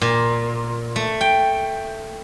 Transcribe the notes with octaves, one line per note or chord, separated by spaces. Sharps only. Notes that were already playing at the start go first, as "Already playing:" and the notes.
A#2
A3
G5